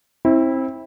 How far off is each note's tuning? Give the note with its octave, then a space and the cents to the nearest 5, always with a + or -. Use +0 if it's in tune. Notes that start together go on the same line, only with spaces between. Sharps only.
C4 +25 E4 -15